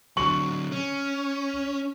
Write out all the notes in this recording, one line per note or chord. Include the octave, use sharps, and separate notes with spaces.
D3 F#3 C#6 F#7
C#4